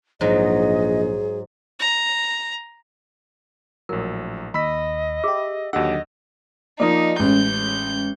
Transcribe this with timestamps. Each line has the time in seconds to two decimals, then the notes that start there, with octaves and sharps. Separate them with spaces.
0.21 A#1 G#2 F#3 G#4 D#5
1.79 A#5
3.89 A#1 A2 F#3 A#4
4.54 D#2 D#5 B5 E6 B6
5.24 G4 G#4 E5
5.73 D#2 D3 F#3 G4 D#5 F#5 E6
6.80 F3 A#3 D#4 D5 D#5 D#6
7.19 A1 G#3 C#4 G6